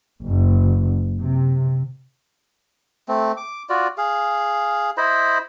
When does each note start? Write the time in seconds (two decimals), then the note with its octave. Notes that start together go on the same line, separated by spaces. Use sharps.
0.25 F#1
1.21 C3
3.09 A3 C4
3.37 D6
3.69 F4 F#4 D5
3.98 G#4 F5
4.98 E4 C5 D#5 B5